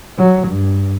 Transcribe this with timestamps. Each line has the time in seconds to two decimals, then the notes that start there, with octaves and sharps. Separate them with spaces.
0.18 F#3
0.48 G2